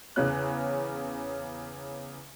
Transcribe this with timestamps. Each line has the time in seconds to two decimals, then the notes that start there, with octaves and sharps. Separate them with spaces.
0.16 E2 C#3 C#4 F#6